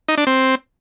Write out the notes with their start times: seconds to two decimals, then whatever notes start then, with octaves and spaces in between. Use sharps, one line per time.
0.08 D#4
0.18 D4
0.27 C4